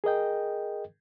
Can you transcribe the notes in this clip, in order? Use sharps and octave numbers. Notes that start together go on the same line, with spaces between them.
G#4 A#4 D#5 G5